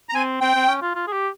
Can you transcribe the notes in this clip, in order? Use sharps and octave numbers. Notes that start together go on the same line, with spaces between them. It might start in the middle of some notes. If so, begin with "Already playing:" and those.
A#5
C4 G#5
C4 G5
C4
C#4
F4
F4
G#4
G4